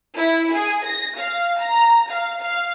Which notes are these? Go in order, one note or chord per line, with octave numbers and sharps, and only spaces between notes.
E4
G#4
A#6
F5
A#5
F5
F5